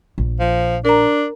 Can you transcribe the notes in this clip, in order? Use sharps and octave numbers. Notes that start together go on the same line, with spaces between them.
A#1
F3
D4 A#4 A#5